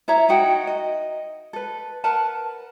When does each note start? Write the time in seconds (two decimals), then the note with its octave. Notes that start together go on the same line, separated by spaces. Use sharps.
0.08 E4 C#5 E5 A#5
0.29 D#4 F#4 F#5 G5
0.67 D#5
1.53 A4 B4
2.04 A#4 B4 F#5 A5